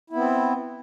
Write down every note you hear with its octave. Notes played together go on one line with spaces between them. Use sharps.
B3 C4 E4